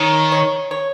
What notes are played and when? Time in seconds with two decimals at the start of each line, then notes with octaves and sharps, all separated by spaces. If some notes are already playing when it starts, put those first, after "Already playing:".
Already playing: D#3 C#5
0.32 C#5
0.71 C#5